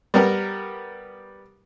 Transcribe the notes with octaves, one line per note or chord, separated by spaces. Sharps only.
G3 B3 A#4